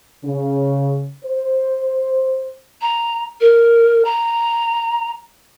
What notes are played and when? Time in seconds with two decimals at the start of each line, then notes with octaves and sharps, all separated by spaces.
0.24 C#3
1.25 C5
2.82 A#5
3.41 A#4
4.05 A#5